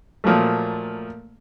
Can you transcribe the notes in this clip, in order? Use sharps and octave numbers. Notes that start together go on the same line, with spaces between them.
A#2 F3 F#3 A3